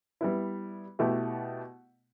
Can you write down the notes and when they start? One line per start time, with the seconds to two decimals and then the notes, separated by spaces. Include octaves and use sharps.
0.21 G3 B3 E4
0.99 B2 A3 E4 G4